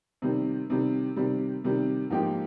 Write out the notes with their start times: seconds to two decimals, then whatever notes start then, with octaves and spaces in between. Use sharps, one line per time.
0.22 C3 D#3 G3
0.70 C3 D#3 G3
1.16 C3 D#3 G3
1.64 C3 D#3 G3
2.10 G#2 F3 A#3 D#4 G4